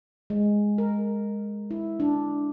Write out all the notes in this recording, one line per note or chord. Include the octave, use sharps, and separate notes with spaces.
G#3
A#4
E4
D4